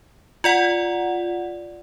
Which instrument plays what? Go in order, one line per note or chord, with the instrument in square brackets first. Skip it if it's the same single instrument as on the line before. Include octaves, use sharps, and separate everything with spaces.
[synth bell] F4 D5 F#5